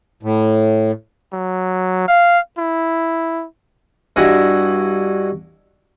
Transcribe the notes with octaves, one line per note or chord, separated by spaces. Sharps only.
A2
F#3
F5
E4
G2 E4 F#4 D#5 F#5 G#5